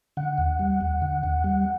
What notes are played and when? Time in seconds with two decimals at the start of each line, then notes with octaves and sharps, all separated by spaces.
0.17 D3 F#5
0.38 D#2
0.59 G3
0.81 D#2
1.02 D3
1.23 D#2
1.44 G3